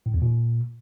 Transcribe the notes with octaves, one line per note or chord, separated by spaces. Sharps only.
A2
E2
A#2